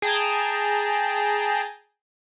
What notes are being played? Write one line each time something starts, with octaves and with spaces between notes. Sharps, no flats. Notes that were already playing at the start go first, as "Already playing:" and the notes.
G#4 G5 A5 A#5